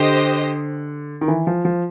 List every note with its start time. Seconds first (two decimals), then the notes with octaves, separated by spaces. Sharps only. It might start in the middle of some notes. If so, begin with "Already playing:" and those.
Already playing: D3 G4 C5 D#5
1.21 D#3
1.28 E3
1.47 F3
1.65 F3